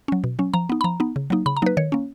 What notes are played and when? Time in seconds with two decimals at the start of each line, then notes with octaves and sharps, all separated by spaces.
0.08 F#3 C#4
0.24 B2
0.39 F#3 C#4
0.54 F3 A#5
0.69 B3 D#4
0.81 B5
0.84 F3 A#5
1.00 B3 D#4
1.16 C#3
1.30 F#3 A#3 D#4
1.46 C#3 B5
1.57 A#5
1.62 F#3 A#3 D#4 B4
1.77 D#3 C#5
1.92 A#3 C#4